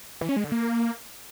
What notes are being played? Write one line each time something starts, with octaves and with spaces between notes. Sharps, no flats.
E3
C#4
G#3
D3
A#3